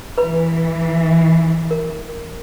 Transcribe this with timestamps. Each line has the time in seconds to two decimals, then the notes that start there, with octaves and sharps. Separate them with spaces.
0.18 E3 B4 B5
1.71 A#4